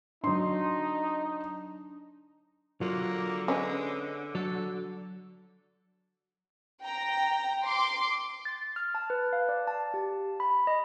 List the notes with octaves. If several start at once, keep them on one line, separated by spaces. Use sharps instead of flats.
F#3 D4 D#4 C6
D3 F#3 A#3 F4
G#3 C#4 B4
F#3 A4
G5 A#5
C6 D6
A6
F6
A5
B4
F5
D5
A5
G4
B5
D#5